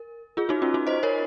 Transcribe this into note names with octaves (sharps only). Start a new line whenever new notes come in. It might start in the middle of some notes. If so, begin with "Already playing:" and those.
Already playing: A#4
F4 G#4
D#4 F#4
C#4 F4
D#4 F#4
C5 D#5
A#4 C#5